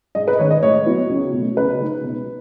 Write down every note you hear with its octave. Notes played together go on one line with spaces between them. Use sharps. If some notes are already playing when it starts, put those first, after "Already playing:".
G#2 D#5
B4
D#3 G#3 C#4 C#5
D#5
A2 C#5
F#3 B3 E4
C#2
B2 F#3 A3
C#2 B4
C#3 G#3 D#4
B2